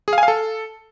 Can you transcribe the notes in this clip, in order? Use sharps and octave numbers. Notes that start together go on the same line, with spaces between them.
G#4
F5
G#5
F5
A4